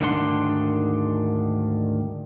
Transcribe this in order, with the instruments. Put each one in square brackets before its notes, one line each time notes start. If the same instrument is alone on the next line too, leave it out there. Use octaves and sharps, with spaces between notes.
[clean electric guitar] D2 G#2 D#3 D4 F#5 C6